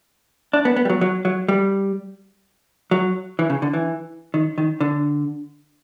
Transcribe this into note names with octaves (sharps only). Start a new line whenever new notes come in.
D4
B3
B3
G3
F#3
F#3
F#3
G3
F#3
E3
C#3
D3
E3
D#3
D#3
D3